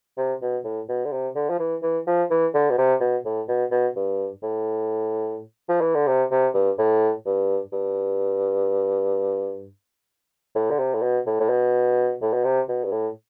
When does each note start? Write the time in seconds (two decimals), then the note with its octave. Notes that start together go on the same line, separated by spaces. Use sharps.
0.18 C3
0.42 B2
0.65 A2
0.89 B2
1.05 D3
1.12 C3
1.36 D3
1.50 F3
1.59 E3
1.82 E3
2.07 F3
2.30 E3
2.54 D3
2.70 B2
2.78 C3
3.00 B2
3.25 A2
3.48 B2
3.71 B2
3.96 G2
4.43 A2
5.69 F3
5.81 E3
5.95 D3
6.07 C3
6.31 C3
6.54 G2
6.79 A2
7.26 G2
7.73 G2
10.55 A2
10.71 D3
10.79 C3
10.94 A2
11.03 B2
11.27 A2
11.40 A2
11.50 B2
12.22 A2
12.34 B2
12.45 C3
12.69 B2
12.84 G2
12.92 A2